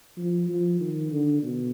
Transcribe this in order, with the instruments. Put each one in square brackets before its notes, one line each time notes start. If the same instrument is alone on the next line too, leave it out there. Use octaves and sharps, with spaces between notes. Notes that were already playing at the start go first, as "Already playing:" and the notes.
[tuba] F3
F3
D#3
D3
B2